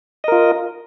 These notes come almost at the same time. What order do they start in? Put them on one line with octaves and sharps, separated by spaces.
D#5 A#4 F4